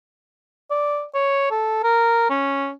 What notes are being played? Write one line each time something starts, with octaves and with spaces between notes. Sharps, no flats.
D5
C#5
A4
A#4
C#4